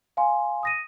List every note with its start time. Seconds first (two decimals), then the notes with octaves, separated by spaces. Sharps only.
0.17 F5 G#5 C6
0.63 D#6 A#6 D#7